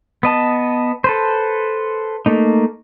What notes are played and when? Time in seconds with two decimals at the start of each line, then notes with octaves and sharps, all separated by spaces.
0.23 B3 D#5 A5
1.04 A4 B4 C5
2.26 A3 A#3 D#4